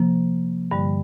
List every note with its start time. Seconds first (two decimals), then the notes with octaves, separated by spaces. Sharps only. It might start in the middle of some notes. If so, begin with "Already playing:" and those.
Already playing: C3 F3 A#3
0.71 G2 D3 G3